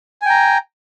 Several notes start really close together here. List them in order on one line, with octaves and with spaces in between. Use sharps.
G#5 G5 A#5